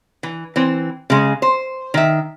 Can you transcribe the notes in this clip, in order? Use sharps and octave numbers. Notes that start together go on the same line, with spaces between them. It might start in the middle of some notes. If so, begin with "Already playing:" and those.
E3
E3 C4
C#3 G#3
C5
D#3 E5